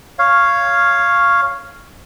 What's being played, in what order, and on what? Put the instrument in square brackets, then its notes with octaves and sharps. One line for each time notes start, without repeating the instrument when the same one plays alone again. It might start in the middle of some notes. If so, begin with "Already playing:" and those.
[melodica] C#5 F5